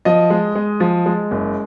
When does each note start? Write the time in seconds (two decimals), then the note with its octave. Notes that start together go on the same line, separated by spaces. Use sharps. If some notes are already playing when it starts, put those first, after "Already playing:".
0.05 F3 D#5
0.30 G#3
0.55 G#3
0.80 F3
1.06 G#3
1.31 F#1